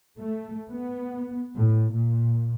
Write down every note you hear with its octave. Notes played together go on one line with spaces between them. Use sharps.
A3
B3
A2
A#2